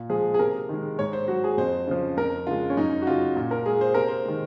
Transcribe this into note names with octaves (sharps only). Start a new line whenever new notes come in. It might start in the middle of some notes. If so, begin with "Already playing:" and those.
Already playing: A#2
F3 G#3 G#4
G#4
C3 A#4
D#3 G#3
G#2 C#5
C5
F#3 F#4
G#4
F2 C5
C#3 F3
F2 A#4
C#3 G#3 F4
C#4
F#2 D#4
F#4
C#3 F#3 F4
A#2
A#4
G#3 G#4
C5
C3 A#4
C5
D#3 G#3